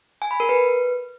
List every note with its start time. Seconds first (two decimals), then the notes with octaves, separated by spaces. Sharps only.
0.22 G#5
0.31 B5
0.40 A#4
0.49 B4